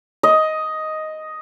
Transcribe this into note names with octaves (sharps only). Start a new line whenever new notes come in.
D#5